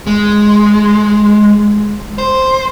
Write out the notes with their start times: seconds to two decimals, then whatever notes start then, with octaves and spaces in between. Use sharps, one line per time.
0.07 G#3
2.18 C5